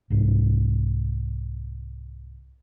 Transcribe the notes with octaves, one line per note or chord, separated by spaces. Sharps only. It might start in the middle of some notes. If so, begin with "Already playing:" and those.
C2 G#2